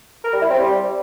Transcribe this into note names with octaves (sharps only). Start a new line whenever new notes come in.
A#4
G3
E4
C4
G3